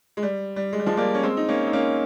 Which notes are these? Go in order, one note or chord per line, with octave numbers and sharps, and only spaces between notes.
G#3
G3
G3
G#3
G3
F3 G#3
G3 A#3
C#4
G#3 C4
D#4
A#3 C#4
D#4
A#3 C#4